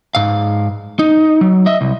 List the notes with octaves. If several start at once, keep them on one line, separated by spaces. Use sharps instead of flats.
G#2 F5
D#4
F#3
D#5 E5
C2